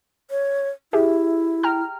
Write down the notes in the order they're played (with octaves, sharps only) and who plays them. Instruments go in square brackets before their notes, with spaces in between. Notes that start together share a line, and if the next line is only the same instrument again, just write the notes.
[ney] C#5
[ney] E4 [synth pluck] G4 G#4 E5
[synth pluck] G5 A#5 F6